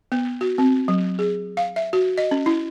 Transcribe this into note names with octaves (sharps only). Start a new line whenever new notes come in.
B3
F#4
C4
F#3
G#4
F5
E5
F#4
D#5
C#4
E4